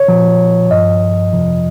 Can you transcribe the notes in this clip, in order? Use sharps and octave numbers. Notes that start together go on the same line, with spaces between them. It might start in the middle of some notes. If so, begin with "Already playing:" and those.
Already playing: C#5
A#2 F3
G2 F3 D#5
F2 C3 F3